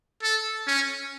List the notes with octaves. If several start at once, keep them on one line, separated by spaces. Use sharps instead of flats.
A4
C#4